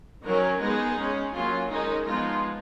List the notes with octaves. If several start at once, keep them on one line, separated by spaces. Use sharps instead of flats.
D#3 F#3 C#4 A#4
G#3 B3 D#4 G#4
G#3 C#4
F#3 A#3 C#4 F4
D#3 G#3 C#4 D#4
F3 G#3 B3 D#4 F4